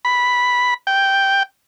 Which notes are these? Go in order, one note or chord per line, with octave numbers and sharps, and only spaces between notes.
B5
G5